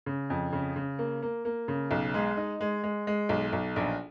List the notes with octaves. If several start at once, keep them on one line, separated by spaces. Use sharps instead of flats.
C#3
F2
C#3
C#3
A#3
A#3
A#3
C#3
B1
G#3
D#4
G#3
G#3
G#3
B1
B1
A#1